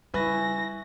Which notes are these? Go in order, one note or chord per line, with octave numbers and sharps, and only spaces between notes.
C#3 G3 E4 B4 E5 G#5 C#6 A#6